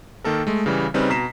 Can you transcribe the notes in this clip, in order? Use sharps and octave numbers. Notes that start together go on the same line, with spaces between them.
D#3 A#3 A4 A#4
G#3 A3
C#3 E3 G3
C#3 G3 C4 C#4 D#4 B4
B2 A#5 B6 C7 E7